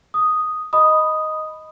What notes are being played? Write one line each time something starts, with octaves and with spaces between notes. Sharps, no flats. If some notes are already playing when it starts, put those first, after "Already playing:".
D#6
D#5 B5 D#6